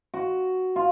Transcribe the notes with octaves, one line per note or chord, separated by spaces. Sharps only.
F#4
F4